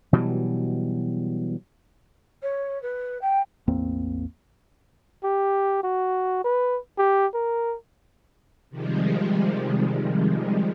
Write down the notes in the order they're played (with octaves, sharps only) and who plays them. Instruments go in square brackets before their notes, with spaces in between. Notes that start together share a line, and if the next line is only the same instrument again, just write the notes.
[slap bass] B2 E3 F#3 G3
[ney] C#5
B4
G5
[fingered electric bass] A1 E2 A#3 C4
[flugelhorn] G4
F#4
B4
G4
A#4
[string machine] C3 D#3 F3 G3 G#3